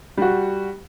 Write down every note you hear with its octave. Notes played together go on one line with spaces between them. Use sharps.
G3 F#4